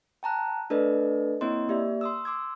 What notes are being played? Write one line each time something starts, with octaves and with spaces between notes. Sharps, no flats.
G5 A5 A#5 F#6
A3 D4 A4 B4 D5 D#5
A#3 C4 E4 C#5 D#5 C6
A#3 G4 D5 E5
C6 D#6 E6
C6 D6 E6 G#6